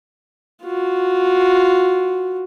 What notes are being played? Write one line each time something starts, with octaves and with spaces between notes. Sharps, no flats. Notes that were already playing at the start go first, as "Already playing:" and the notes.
F4 F#4